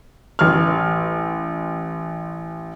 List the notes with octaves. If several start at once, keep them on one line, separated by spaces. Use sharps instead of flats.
A1 F6